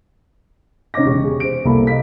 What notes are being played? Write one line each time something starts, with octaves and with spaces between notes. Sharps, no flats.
C3 C#4 D#4 D#5 D6 A#6
E1 C#3 G4 C#6
G#4
C5 D7
C2 A#3 A4 B5
D#5 F5 B6